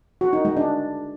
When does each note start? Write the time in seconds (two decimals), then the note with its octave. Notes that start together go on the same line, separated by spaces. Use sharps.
0.21 F#4
0.33 D#4
0.45 G#3
0.57 D4